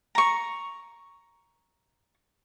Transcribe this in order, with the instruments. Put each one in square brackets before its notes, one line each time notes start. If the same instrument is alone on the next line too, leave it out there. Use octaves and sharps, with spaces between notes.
[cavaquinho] A#5 C#6